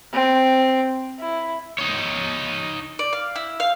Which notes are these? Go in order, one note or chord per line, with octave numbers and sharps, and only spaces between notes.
C4
E4
D#4 C#5
D5
F5
E4
F5